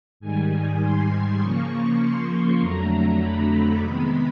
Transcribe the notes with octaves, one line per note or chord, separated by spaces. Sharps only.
G#2 D#3 G3 G#5
G#5
C6
C6
C#3 F3 A#3 C#6
C6
F2 D3 F#3 A3 A#5
A#5
B5
C3 D#3 G#3 B3